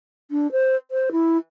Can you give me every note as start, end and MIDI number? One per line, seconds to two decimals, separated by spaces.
0.31 0.50 62
0.52 0.76 72
0.91 1.09 72
1.12 1.38 64